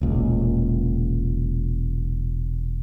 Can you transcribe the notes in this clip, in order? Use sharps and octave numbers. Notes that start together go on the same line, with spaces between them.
E1 C#2 A#2